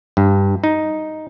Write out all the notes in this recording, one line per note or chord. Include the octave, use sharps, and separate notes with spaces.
G2
D#4